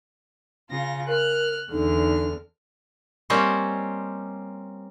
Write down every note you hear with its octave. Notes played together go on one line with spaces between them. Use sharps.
C#3 F4 A#6
A#4 F6 F#6
E2 D3 D#4 F6
G3 A#3 C4 C#4 C5 D#5